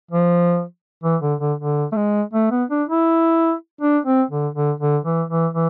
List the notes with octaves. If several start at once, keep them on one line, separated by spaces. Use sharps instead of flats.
F3
E3
D3
D3
D3
A3
G#3
A3
B3
D4
E4
D4
C4
D3
D3
D3
E3
E3
E3